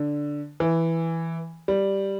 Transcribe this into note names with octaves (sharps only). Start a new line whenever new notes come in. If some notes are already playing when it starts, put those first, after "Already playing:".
Already playing: D3
E3
G3